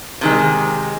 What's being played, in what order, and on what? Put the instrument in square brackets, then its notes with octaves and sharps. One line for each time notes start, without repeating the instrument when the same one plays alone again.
[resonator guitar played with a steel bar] C3 D#3 G#3